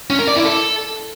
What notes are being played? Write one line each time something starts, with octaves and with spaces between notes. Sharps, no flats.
C#4
A#4
D5
E4
A4